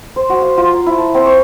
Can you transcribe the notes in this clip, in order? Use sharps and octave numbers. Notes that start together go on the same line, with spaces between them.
C5
F#4
F5
F4
A#5
E4
A5
C4
C#6